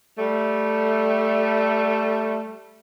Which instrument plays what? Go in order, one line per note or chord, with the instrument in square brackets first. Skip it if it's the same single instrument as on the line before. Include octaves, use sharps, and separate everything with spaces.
[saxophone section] G3 A3